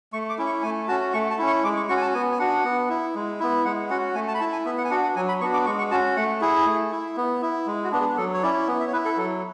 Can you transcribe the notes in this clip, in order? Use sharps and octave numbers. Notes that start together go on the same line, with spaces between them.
A3 C#6
D6
C#4 E4
C#6
A3 G#5
C#4 F#4 A5
A3 C#6
A5
C#4 E4
C#6
G#3 D6
C#6
C#4 F#4 C#6
G#5
A5
B3 G#5
G#5
D4 F#4 F#5
B3
E4
G#3
B3 E4
G#3 F#5
C#4 F#4 F#5
A3 G#5
A5
B5
E4 A5
G#5
B3 E5
F#5
G#5
D4 F#4 F#5
F#5
F#3 G#5
B5
B3 D4 F#4 C#6
D6
G#3 C#6
C#6
C#4 F#4 A5
A3 F#5
E4 G#4
A3
E4
B3
E4
G#3
F#4
B3 D4
G#4
F#3 A4
C#5
C#4 E4 D5
B3
E5
C#5
E4 B4
A4
F#3 A4